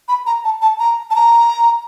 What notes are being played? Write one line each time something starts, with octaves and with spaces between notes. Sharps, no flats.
B5
A#5
A5
A5
A#5
A5
A#5